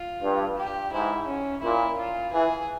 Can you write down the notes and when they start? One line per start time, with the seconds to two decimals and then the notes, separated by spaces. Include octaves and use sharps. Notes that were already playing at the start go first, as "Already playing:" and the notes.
Already playing: F4
0.22 G2
0.57 G4
0.92 G#2 E4
1.27 C#4
1.62 A#2 E4
1.98 F4
2.33 E3 G#4